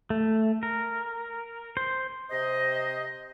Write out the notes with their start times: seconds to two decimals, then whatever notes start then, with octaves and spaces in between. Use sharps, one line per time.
0.10 A3
0.63 A#4
1.77 C5
2.31 C3 C5 D#5